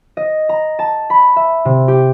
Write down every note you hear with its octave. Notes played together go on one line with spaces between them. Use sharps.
D#5
A#5
A5
B5
E5
C3
G4